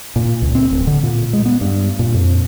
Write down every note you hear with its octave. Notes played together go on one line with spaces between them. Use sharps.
A#2
C#2
C4
D1
D3
A#2
G#3
B3
G2
A#2
F2